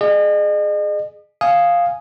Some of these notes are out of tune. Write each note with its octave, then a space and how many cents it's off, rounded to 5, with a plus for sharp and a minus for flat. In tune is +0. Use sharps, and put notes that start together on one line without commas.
G#4 +10 D#5 -40
F5 +0 G#5 +0 D#6 +0